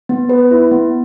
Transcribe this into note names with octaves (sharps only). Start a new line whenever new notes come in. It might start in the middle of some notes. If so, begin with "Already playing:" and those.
B3
B4
E4
B3